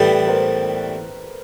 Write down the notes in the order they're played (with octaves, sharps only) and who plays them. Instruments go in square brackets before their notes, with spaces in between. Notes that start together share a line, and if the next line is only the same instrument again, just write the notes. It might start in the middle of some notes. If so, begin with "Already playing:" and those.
Already playing: [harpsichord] A2 E3 G3 B3 [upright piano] A4 B4
[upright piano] A#4 C5